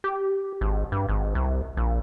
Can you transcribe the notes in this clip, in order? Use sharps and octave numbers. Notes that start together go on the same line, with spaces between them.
G4
G#1
G2
G#1
C2
A#1